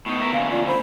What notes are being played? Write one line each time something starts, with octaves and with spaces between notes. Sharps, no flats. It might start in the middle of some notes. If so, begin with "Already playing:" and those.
A2 B3 D#4 C#6
A#4 E5
D3 A#3 C#4 F5
F4 D5
C5 B5